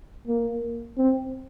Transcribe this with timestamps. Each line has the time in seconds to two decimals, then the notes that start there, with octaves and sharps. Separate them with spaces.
0.28 A#3
0.98 C4